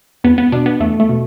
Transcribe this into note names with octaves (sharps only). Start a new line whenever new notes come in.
E2 B3
B3
B2 D4
B3
E2 A3
A3
B2